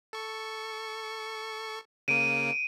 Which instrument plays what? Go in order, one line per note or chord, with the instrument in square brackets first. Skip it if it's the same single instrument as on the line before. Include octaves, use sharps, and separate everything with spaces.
[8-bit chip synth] A4 C#6
[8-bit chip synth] C#3 A#3 [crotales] D7 D#7